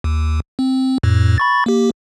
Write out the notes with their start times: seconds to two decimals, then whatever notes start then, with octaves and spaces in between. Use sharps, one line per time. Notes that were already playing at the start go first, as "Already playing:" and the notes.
0.04 D#2
0.59 C4
1.03 F2 A2
1.38 B5 C#6 A6
1.66 A#3 G4